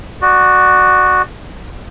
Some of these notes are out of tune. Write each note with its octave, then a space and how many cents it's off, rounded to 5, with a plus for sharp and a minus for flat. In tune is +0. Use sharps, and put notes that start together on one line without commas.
F#4 +0 D5 +25